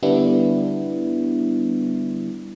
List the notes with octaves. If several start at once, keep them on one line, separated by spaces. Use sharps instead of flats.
D3 G3 B3 D4 E4